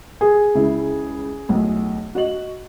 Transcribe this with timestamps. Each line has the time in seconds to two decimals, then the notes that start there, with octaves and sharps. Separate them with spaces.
0.21 G#4
0.55 C#2 C#3 E4
1.49 B1 A2
2.15 F#4 D#5 F#7